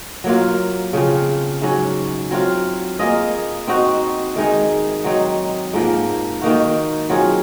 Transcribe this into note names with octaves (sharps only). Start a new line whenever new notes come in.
F#3 A#3 F4
C#3 F3 C4
G#2 F#3 C#4
F#3 C4 F4
A#3 F4 G#4 D#5
C4 D#4 F#4
D#3 G#3 D#4
F#3 C4 D#4
G#2 F3 A#3
D#3 A#3 D#4 F#4
F#3 C4 F4 G#4